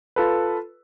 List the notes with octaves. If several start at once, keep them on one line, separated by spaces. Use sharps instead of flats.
F4 A4 B4